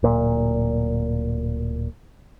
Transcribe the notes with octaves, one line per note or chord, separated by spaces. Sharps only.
D1 A#2